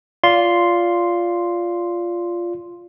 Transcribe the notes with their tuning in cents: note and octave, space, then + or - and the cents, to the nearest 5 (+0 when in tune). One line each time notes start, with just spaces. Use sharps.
F4 -5 D5 -20 C6 +0